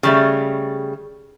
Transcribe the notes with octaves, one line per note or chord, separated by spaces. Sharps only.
C#3 G3 A3